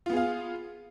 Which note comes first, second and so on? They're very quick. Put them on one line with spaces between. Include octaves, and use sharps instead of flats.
F4 B3 G#4 F5